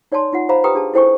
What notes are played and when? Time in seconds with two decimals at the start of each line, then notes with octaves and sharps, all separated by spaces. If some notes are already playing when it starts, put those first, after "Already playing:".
0.12 D#4 C#5 D5 G#5 A5 C6
0.33 D#4 F4 F#5
0.49 C5 F5 A#5 B5
0.64 G4 B4 G5 A#5 D#6
0.75 D4 G#4 A5
0.93 E4 A4 C5 G5 G#5 C#6